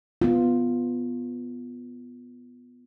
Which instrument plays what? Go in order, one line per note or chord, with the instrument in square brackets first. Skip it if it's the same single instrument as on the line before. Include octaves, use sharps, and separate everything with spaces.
[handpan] B3 F4